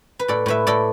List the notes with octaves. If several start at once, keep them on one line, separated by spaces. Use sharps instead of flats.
B4
A2 A4 D5
A2 B4 E5
A2 A4 D5